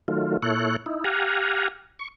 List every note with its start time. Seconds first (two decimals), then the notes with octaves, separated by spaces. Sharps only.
0.08 D#3 F#3 A3 F4
0.42 A#2 E4 A4 C#5 F#6
0.86 D#4 E4
1.04 G4 F5 F#5 G#5 A#5
1.99 C#6